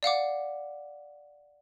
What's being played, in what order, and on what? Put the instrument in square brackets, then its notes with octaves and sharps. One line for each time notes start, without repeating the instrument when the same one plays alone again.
[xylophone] D5 F5 F#5 D6